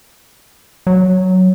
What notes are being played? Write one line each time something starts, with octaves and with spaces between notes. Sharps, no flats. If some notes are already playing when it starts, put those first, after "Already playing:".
F#3